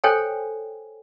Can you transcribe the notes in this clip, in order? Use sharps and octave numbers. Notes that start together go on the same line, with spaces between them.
A4 C5 C#5 G5 G#5